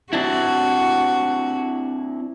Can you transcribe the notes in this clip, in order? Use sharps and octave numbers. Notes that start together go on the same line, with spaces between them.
C4 D4 E4 F#4